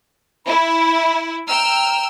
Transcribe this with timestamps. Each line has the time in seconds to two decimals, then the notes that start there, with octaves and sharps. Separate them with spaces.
0.46 E4 B5
1.48 G5 A#5 E6 F6